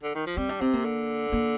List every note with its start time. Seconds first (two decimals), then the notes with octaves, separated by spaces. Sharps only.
0.03 D3
0.15 D#3
0.26 F3
0.37 G3 C4
0.49 D4
0.61 C3 C4
0.73 A#3
0.85 D3
1.32 A#3